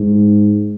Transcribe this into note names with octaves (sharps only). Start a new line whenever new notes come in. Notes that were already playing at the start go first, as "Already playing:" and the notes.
Already playing: G#2